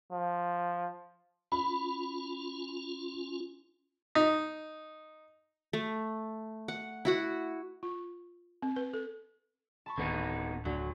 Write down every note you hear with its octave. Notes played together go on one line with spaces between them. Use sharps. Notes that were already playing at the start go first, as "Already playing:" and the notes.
F3
C#4 F4 B5
D#4
A3
F#5
E4 F#4 F#5
F4
C4
B4
A4
A5 B5 C#6
D1 D3 D#3 B3 D#4
D2 F#3